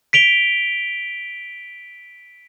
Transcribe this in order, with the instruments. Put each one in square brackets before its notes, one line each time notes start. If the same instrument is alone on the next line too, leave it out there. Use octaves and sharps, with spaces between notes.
[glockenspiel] B6 D7 F7 G7